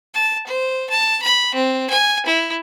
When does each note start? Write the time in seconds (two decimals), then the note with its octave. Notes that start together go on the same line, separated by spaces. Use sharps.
0.14 A5
0.47 C5
0.90 A5
1.23 B5
1.54 C4
1.90 G#5
2.26 E4